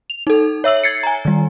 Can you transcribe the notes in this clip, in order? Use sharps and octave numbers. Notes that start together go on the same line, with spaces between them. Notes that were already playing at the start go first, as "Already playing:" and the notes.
F7
D#4 A4
C#5 E5 E6 F#7
G#6 A6 C7 C#7
G#5 A#5
D#3 G3